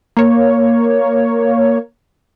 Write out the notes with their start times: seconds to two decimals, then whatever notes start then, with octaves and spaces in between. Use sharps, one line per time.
0.17 A#3 C#5